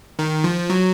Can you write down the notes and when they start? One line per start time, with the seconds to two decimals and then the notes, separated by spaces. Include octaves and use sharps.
0.19 D#3
0.44 F3
0.70 F#3